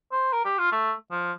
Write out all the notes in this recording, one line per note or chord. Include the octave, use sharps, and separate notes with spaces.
C5
A#4
G4
F4
A3
F3